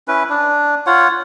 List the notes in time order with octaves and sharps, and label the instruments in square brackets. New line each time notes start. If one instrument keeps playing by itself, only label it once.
[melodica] C#4 E4 B4
D4
F4 C#5 F#5